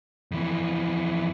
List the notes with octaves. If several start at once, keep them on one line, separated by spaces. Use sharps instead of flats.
F2 E3